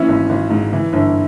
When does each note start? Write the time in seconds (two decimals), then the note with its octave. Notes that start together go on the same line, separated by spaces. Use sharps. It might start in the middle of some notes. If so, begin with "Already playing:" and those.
Already playing: A#2 E3 C#4 E4
0.09 G#1
0.29 G#1
0.50 G#2
0.73 E3
0.93 G1